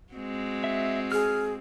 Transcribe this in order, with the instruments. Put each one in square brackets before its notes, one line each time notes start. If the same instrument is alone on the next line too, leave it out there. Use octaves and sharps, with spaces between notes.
[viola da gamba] G#3 C4 F#4
[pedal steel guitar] E5
[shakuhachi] G#4 [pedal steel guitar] F6